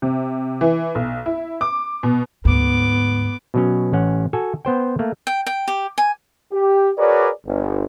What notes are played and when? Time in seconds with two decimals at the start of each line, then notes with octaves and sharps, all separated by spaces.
0.02 C3
0.61 E3
0.95 B1
1.26 E4
1.61 D6
2.03 B2
2.45 D2 G#2 B3 D6
3.54 B2 F#3 C#4
3.93 A1 C#4 F#5
4.33 F#4 A4 G#5
4.65 B3 C5 G5
4.99 A3 A#3
5.27 G5
5.46 G5
5.68 G4
5.98 G#5
6.52 G4
6.98 F#4 G#4 A#4 B4 C#5 D5
7.46 G1